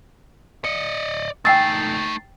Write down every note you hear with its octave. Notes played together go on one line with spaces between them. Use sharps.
D5 D#5 C#7
A3 D#4 G5 G#5 E6 A6 C7